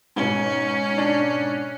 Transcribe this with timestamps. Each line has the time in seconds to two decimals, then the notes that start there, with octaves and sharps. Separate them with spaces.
0.16 G#2 B2 C#4
0.98 D4